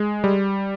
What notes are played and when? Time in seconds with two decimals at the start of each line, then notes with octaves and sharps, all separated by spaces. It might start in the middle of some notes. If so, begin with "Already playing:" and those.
Already playing: G#3
0.24 G3